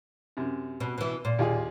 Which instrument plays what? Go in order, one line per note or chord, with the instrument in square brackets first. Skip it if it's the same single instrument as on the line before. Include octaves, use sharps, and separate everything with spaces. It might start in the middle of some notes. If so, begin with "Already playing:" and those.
[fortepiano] F#2 C3
[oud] B2
B2 E3
A#2
[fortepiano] D#2 F4 G#4